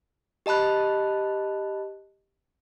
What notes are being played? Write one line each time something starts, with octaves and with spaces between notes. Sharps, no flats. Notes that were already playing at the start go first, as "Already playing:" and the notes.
G4 D#5 A5 B5 F#6